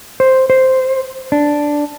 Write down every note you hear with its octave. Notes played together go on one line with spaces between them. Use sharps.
C5
C5
D4